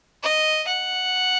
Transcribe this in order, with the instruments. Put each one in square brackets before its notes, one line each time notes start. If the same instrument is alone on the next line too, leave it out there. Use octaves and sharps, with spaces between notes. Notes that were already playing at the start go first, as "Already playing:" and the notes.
[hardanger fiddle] D#5
F#5